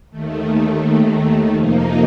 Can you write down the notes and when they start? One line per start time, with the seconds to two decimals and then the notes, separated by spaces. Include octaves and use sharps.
0.10 D#2 D#3 A3
1.53 F2 C3 F3 A#3 D#4